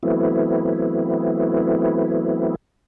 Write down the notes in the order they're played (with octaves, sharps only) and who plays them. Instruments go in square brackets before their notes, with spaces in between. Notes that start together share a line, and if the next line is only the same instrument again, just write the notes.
[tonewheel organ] E3 F#3 A3 B3 C4 E4